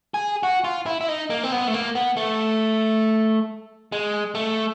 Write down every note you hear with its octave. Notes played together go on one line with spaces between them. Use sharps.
G#4
F#4
F4
E4
E4
D#4
A#3
C4
B3
A3
A#3
B3
A3
G#3
A3